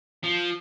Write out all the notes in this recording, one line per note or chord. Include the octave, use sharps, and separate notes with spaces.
F3